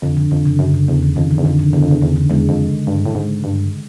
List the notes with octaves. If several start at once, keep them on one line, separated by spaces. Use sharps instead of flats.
F2 D3
D3
F2 D3
C#3
F#2 D3
C#3
E2 C#3
D3
F2 D#3
D3
E2
F2 D3
D3
E2 D3
F2
E2 C#3
E2 D3
D3
E2 G#3
F2
G2
A2
G#2
G2